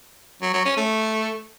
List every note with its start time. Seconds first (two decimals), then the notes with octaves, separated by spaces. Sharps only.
0.42 F#3
0.54 F#3
0.65 C#4
0.77 A3